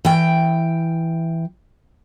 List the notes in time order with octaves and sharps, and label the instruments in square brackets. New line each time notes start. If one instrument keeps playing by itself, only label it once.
[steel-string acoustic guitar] E3 G5